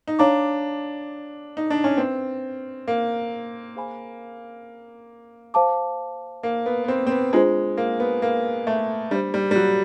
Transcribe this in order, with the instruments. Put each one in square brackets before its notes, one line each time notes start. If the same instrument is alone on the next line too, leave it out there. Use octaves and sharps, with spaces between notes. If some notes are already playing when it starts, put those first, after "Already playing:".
[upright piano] D#4
[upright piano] D4 [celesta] C#5 F5 A#5 D6
[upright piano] D#4
D4
C#4
[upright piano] C4 [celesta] B4 E5 G5
[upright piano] A#3
[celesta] G#4 C5 F5 G#5 B5
C5 F5 A5 D6
[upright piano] A#3
B3
B3
C4
C4
B3
[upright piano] G#3 [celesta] D4 F4 G#4 C5
[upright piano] A#3
B3
A#3
A3
[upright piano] G3 [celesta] D4 G4 C5
[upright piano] G3
G3
F#3